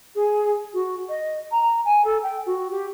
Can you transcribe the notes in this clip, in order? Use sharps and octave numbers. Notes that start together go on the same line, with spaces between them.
G#4
F#4
D#5
A#5
G#5
A4
G5
F#4
G4